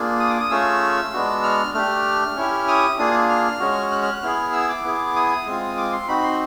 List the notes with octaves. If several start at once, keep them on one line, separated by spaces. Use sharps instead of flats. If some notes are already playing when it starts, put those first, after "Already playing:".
Already playing: A#3 D4 F4 G#4
D#6
D6
D#6
A3 C#4 F4 G#4 E6
G#3 B3 D4 F#4
F6
A3 D4 G4 F6
C#4 E4 G4
D#6
A#3 D4 F4 G#4 D#6
F6
G#3 C#4 F#4
F#6
F6
F#6
B3 E4 G#4 F6
E6
D6
B3 E4 G#4
D#6
G#3 C4 F4
D6
C6
C4 D#4 F#4 B5
C6